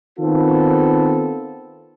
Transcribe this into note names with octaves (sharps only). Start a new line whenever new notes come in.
D#3 B3 C4 F4 A4